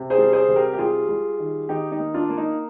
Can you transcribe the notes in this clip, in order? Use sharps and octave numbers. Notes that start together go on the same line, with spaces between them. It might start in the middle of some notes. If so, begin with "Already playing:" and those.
Already playing: C3
G#4 C5
G3
G#4 C5
C3
G4 A#4
G4
G3 F4 G#4
G3
D#3
D#3 D#4 G4
D#4
A#3
D4 F4
A#3
D#4